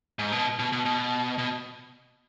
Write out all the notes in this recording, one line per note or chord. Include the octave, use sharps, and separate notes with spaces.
G#2
B2
B2
B2
B2
B2